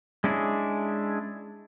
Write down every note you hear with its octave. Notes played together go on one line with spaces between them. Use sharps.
G#3 C#4 D4 E4 G#4